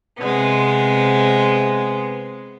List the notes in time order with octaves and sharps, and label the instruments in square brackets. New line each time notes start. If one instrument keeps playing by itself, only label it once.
[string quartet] C3 G#3 B3